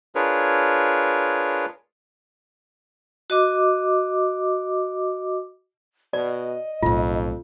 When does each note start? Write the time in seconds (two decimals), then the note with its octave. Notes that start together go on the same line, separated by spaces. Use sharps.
0.15 D4 F4 G#4 A#4 B4 C#5
3.30 F#4 D#5 D6
6.13 B2 D5 D#5
6.82 B1 F2 A2 F4